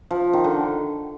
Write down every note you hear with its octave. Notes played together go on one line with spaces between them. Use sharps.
F3
D#3
D3